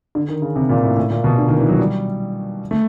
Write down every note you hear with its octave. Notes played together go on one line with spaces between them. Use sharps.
D3
D#3
C#3
C3
A#2
A2
A2
A#2
B2
D3
D#3
E3
F#3
G3
A3